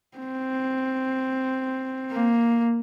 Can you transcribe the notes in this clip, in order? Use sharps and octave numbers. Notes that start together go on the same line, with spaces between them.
C4
A#3